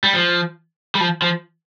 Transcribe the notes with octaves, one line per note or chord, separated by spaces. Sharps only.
G3
F3
G3
F3
F3